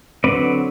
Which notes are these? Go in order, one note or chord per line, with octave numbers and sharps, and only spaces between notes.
D3 F#3 C4 B4 D5